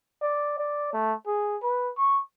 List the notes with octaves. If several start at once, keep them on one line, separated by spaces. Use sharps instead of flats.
D5
D5
A3
G#4
B4
C#6